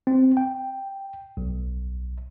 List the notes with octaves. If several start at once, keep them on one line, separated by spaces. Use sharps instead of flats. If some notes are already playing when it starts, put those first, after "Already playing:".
C4
G5
B1